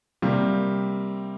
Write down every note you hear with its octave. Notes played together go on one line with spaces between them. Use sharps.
C3 G3 A#3